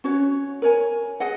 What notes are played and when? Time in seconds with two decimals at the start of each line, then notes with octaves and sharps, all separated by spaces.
0.04 C#4 F#4 C#5
0.62 A#4 C#5 G#5
1.20 G#4 D#5 F#5